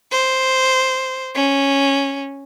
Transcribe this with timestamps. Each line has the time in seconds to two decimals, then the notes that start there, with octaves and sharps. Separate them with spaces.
0.11 C5
1.35 C#4